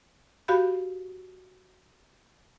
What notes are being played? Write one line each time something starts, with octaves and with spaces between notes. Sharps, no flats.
F#4 G4 F5 B5 G6